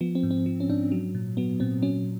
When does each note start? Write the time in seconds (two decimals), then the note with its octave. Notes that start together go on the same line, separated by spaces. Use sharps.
0.01 F3 B3
0.15 C4
0.23 G#2
0.31 C4
0.46 F3
0.60 C#4
0.69 G#2 D4
0.92 F#3
1.15 A#2
1.37 F#3 B3
1.60 A#2 C4
1.82 F#3 C#4